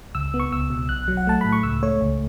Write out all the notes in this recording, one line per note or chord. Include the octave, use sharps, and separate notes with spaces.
C#2 E6
B3
C#6
C#2 E6
B2
B1 F#6
F#3
F#5
A3 A5
A2 B5
C#6
C#2 E6
A3 C#5
C#2